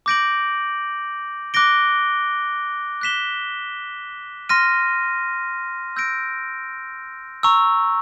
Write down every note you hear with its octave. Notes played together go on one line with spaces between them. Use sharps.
D6 G6 A#6 D7 F#7
D6 F#6 A#6 D7 G7
F#6 B6 E7 G7
C6 F6 A#6 D#7
E6 G6 A#6 D7
A#5 C#6 E6